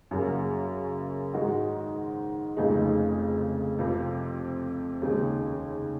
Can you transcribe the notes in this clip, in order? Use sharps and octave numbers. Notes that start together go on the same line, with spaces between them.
F#2 C#3 F#3 A#3
G#2 D#3 G#3 D#4 F#4
F1 F2 C#3 G#3 D#4
F2 C3 F3
D#2 C#3 G#3